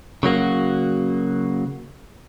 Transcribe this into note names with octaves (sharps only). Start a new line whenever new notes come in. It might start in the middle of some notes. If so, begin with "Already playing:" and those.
C#3 F#3 A#3 F#4